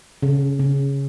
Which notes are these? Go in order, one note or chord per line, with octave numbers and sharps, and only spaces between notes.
C#3
C#3